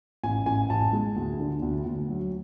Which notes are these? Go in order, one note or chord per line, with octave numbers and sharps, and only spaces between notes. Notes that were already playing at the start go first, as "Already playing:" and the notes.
A1 G#5
A1 G#5
A1 A5
G#3
D2
D3
D2
D2
F#3